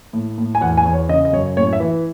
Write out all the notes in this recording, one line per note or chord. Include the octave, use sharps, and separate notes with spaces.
A2
A2
G#5
E2 F#5
G#5
E2
C#5
C#3 D#5
D#5
F#2 C#5
A2 C#5
E5
E3